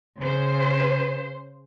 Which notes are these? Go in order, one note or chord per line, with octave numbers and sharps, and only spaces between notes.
C#3 C5